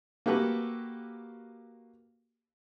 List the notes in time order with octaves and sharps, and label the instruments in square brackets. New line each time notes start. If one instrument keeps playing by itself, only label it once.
[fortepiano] A#3 F#4 G4 A4 B4